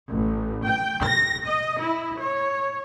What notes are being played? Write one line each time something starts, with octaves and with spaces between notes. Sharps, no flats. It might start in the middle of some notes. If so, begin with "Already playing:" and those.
A1
G5
A#6
D#5
E4
C#5